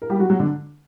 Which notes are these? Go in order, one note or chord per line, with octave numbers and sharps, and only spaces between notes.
A#4
G3 G4
F#3 F#4
F#3 F#4
D3 D4